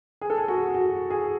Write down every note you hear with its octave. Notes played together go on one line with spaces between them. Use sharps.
G#4
A4
G#4
F#4
F#4
G#4